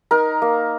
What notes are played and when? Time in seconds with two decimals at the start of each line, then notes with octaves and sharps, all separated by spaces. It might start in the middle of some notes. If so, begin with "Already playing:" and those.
0.11 D#4 A#4
0.42 A#3